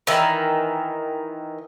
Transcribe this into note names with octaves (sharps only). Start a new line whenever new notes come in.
D#3 E3